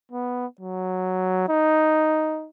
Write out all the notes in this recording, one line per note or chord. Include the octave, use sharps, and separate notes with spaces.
B3
F#3
D#4